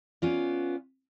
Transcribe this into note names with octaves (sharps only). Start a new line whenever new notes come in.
B3 C#4 F4 D5